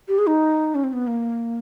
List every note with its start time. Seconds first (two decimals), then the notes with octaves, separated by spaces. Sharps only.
0.08 G4
0.18 G#4
0.28 D#4
0.75 C#4
0.84 C4
0.93 B3
1.07 A#3